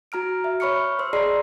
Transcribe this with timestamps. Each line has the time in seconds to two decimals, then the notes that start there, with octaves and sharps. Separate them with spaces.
0.12 F#4 A#5 F6 D7
0.44 E5
0.60 C#5 B5 C#6 F6 C#7
0.99 C5 C6 E6
1.13 G#4 D5 D#5 A#5 C6 C7